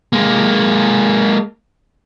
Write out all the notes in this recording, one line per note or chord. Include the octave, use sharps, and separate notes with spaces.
G#3 A#3